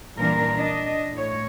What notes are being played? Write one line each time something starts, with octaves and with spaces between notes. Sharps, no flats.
A#2 E3 G3 D4 A#4
D4 D#5
A2 C#5